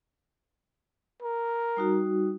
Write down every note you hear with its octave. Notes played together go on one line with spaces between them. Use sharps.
A#4
G3 D#4 F#4